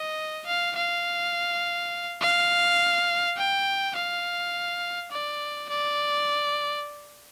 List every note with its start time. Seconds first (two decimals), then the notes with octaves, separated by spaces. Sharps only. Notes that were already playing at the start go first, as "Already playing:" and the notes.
Already playing: D#5
0.47 F5
0.76 F5
2.21 F5
3.38 G5
3.95 F5
5.11 D5
5.69 D5